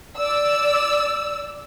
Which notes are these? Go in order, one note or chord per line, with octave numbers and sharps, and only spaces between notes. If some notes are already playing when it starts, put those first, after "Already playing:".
D5 E6